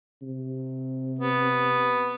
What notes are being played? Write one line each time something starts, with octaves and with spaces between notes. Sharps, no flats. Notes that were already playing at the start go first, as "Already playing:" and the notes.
C3
B3